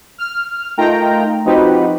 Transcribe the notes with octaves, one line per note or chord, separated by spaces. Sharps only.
F6
A3 D#4 F4 A#4 G5 A#5
F3 C4 D#4 F#4 G4 B4